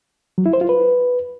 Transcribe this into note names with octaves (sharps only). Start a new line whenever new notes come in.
F#3
E4
C5
F4
B4